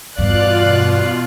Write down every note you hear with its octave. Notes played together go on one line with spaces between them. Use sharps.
E2 G2 B2 F4 D5 F5 F#6